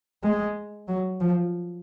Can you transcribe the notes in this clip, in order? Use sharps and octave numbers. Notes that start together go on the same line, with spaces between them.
G#3
F#3
F3